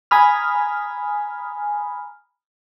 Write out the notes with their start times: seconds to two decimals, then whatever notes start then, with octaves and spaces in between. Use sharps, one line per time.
0.11 G#5 A#5 B5 D#6 F6